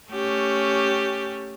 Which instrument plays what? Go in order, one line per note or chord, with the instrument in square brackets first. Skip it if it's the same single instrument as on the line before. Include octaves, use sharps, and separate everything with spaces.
[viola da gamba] A3 C#4 G4